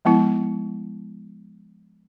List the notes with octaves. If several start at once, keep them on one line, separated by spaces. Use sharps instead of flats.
F3 G#3 B3 E4